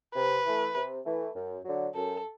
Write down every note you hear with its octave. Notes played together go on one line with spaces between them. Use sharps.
C3 B4
E3 A3
C3
E3 A3
F#2
D3 F#3
F#2 A4